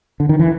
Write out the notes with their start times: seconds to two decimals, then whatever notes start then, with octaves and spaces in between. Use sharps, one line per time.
0.20 D3
0.29 D#3
0.39 E3